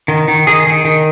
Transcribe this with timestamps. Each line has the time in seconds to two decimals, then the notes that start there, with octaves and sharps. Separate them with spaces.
0.08 D#3
0.28 D#3
0.47 D#3 G#4
0.67 D#3
0.85 D#3